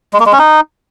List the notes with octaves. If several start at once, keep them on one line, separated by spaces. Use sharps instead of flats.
G#3
A#3
G#3
C#4
D#4